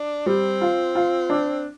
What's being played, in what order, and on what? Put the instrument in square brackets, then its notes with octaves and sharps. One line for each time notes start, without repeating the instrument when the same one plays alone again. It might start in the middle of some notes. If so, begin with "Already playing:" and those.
Already playing: [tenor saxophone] D4
[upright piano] G3 [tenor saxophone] C4
[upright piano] F4
F4
D4